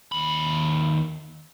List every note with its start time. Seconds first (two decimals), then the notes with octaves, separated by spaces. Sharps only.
0.12 D#2 B5